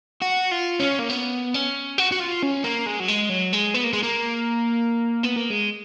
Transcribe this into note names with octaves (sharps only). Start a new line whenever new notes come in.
F#4
F4
C#4
A#3
B3
C#4
F#4
F#4
F4
C#4
A#3
G#3
F#3
G#3
F#3
G#3
B3
A#3
G#3
A#3
B3
A#3
G#3